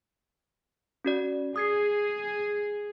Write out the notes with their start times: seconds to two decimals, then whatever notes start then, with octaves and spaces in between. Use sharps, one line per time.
1.05 C#4 F#4 D5
1.56 G#4 D#6 G#6 C7